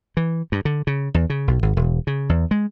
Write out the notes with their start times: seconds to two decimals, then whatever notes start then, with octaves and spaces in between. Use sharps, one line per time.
0.17 E3
0.52 G2
0.65 D3
0.87 C#3
1.14 E2
1.30 C#3
1.48 B1
1.63 G#1
1.77 E1
2.07 C#3
2.29 E2
2.51 G#3